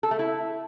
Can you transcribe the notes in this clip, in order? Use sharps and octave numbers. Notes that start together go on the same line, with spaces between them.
A4
A3
E4